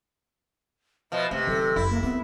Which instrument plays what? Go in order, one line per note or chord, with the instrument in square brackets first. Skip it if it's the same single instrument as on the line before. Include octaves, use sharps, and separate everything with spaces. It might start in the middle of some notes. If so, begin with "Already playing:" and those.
[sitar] B2 F3 [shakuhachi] E5
[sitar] C3 [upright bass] A3
[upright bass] D#3 F#3 [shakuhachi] A4
[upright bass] F#1 [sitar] E4
[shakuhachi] A#3
[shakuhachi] B3 [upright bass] C4